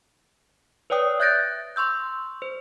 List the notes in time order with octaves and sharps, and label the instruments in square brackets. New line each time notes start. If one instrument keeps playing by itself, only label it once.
[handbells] B4 C#5 D5 G5 D#6
E5 F#6 G6 A6 A#6 D7
C6 C#6 E6 G6
C5